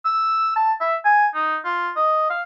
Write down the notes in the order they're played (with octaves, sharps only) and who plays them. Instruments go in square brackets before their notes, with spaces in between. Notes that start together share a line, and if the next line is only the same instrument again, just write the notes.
[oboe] E6
A5
E5
G#5
D#4
F4
D#5
F5